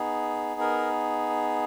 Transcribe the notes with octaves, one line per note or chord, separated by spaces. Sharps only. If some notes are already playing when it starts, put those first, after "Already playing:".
Already playing: B3 D#4 G#4
A#4